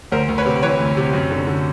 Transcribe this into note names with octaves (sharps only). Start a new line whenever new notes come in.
D2 A#4 C5
D2
B4 C#5
C3
E3 B4 C#5
D2
C3
F#2
D3
D3